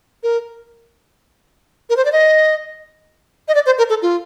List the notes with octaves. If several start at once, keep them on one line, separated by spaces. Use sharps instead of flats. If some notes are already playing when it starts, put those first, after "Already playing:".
A#4
A#4
C5
D5
D#5
D#5
D5
C5
A#4
A4
F4